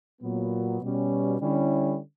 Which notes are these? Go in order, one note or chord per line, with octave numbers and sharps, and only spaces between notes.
A#2 F#3 B3
B2 G3 C#4
D3 G3 C#4 E4